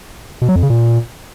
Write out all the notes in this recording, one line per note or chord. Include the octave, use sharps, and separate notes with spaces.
B2
F#3
F2
C#3
A#2